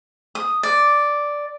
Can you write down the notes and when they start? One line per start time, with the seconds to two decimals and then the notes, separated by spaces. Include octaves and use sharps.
0.35 D#6
0.63 D5